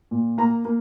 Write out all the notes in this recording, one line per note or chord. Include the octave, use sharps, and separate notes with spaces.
A#2
A#3 A#5
A#3